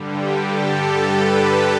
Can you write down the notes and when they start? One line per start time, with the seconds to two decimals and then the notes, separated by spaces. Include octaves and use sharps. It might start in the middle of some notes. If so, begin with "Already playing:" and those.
Already playing: G2 D3 G3
0.09 G4
0.39 G4 A4
1.02 A4 B4